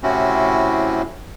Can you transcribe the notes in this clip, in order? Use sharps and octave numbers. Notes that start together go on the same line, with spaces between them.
A2 C3 C4 C#4 E4 F#4